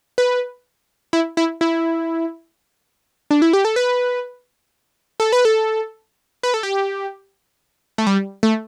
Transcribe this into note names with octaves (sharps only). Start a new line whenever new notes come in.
B4
E4
E4
E4
D4
E4
G4
A4
B4
A4
B4
A4
B4
A4
G4
A3
G3
A3